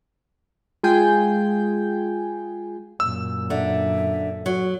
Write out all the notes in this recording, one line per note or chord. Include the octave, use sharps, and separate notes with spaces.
G#3 F4 G#4 G5 G#5 G6
F#2 A#2 E6
D3 E5
F#3